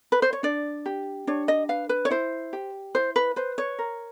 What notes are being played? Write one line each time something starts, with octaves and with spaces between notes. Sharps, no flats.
B4
C5
C#5
D4 D5
G4
D4 C#5
D#5
B4 F5
B4
C#5
E4 C5
G4
E4 C5
B4
B4 C5
C#5
A#4